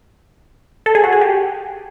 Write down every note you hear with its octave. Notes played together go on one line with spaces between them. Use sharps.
A4
G#4
F#4
G#4
G4